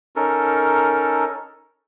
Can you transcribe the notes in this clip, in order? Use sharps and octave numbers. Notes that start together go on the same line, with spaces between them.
C#4 D#4 A4 A#4